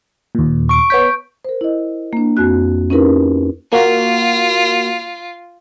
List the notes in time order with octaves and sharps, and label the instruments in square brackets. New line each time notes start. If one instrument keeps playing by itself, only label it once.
[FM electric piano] D#2 A#2
[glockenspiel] C#6 D7
[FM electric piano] B3 C#5 B6 [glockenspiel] G6
[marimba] A#4 C5
E4 D#5
A#3 D4
F2 C4 F#4 F#6
C#4 D#4 E4 G4 A#4 B4
[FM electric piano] A#3 F#4 [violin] F4